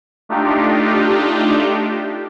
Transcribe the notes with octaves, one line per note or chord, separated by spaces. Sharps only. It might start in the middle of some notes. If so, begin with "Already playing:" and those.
A3 D4 D#4 F4 G4